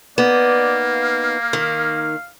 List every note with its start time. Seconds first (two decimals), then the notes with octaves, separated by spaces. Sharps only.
0.18 A#3 B3 D#4 D5
0.95 F5
1.53 D#3